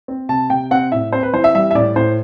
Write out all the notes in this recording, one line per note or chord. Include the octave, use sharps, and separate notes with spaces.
C4
C3 A5
C3 G5
C4 F#5
A2 E5
C4 C5
B4
E3 C5
E5
G3 E5
E5
A2 D5
A2 C5